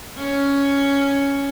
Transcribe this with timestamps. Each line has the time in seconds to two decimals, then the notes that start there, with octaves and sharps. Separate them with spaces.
0.18 C#4